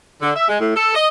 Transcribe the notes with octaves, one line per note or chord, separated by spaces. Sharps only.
D3
E5
G#3
A2
A4
D#5